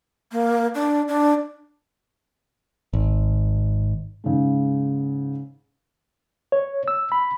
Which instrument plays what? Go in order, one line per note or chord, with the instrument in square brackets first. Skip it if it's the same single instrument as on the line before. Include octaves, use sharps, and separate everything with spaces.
[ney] A#3
D4
D4
[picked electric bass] G#1
[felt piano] G#2 C#3
[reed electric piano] C#5
E6
B5